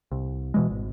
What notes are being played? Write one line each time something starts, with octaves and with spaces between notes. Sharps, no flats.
C2
B2 E3 G#3
G#1